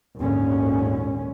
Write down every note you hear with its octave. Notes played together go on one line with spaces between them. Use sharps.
G#1 D#2 A#2 D3 C#4